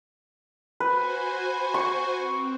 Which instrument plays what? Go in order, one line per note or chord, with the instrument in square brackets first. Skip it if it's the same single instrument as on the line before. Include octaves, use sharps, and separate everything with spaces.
[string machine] F#4 C5 G#5 [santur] B4
[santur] C#6
[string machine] C4